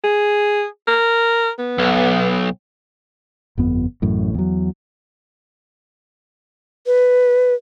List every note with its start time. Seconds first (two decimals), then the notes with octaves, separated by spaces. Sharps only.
0.04 G#4
0.87 A#4
1.59 B3
1.78 B1
3.58 G1 F2 B3
4.02 A1 F#2 A2
4.34 E2 F#3
6.87 B4